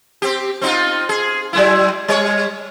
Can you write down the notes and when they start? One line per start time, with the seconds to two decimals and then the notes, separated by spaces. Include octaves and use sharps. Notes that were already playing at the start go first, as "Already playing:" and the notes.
0.22 C4 G4
0.62 C4 D#4 F4
1.09 G#4
1.53 F#3 G#3 E4
2.08 G3 C#5